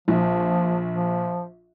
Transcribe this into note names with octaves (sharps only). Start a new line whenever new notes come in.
A#1 F3
F3